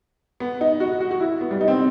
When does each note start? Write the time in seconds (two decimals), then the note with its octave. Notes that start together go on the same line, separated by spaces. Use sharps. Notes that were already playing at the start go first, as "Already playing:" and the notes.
0.40 B3
0.61 D#4
0.80 F#4
1.00 F#4
1.11 F#4
1.20 E4
1.41 B3
1.51 G3
1.61 D#4
1.68 C4